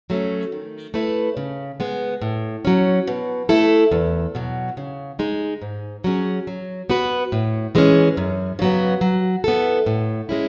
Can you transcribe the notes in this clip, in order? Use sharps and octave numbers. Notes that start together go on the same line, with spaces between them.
F#3 A3 C#4
D#3
A3 E4 B4
C#3
G#3 B3
A2
F#3 C#4
B2
A3 E4 A4
E2
B2 F#3
C#3
G#3 D#4
G#2
F#3 C#4 G#4
F#3
B3 F#4 B4
A2
E3 G#3 C#4
F#2
C#3 F#3 B3
F#3
B3 E4 A4
A2
G#3 C#4 E4